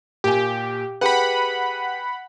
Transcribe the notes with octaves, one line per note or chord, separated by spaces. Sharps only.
A#2 G4 G#5
G4 G#4 B4 F#5 B5